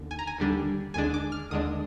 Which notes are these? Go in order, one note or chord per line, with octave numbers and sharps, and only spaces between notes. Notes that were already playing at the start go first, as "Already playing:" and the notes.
Already playing: D#2 D3
G#5
A#5
G#5
D#2 D3 G3 D4
D#2 D3 G#3 D4 G#5
D6
F6
D#2 D3 G#3 D4 D#6